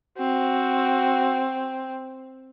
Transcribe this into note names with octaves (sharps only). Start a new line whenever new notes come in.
C4 F#4